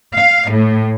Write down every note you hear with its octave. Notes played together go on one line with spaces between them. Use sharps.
F5
A2